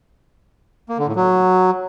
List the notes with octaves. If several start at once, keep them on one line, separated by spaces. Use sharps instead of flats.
A#3
D3
A2
F#3